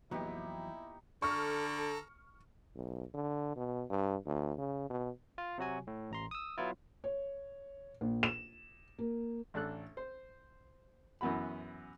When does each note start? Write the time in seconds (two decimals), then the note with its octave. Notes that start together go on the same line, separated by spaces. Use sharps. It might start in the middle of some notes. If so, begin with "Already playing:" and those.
0.11 F2 A#2 E3 F#3 B3 D#4 E4 G4
1.22 D3 A4 A#5 C#6 F6
2.76 B1
3.14 D3
3.56 B2
3.90 G2
4.26 D2
4.59 C#3
4.90 B2
5.38 F4
5.58 C3 F#3 F#4 G#5
5.87 A2
6.11 A1 A#5 C6
6.31 D#6 E6
6.57 F#3 B3 E4 F4
7.04 C#5
8.01 A#1
8.23 E7
8.99 A#3
9.54 A1 D4 A4 F#6
9.97 C5
11.21 F#2 E3 B3 F#4 B5